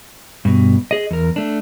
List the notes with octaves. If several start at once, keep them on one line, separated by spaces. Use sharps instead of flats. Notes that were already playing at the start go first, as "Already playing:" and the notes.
G2 B2
G#4 D#5
E2 A#4
A3 D4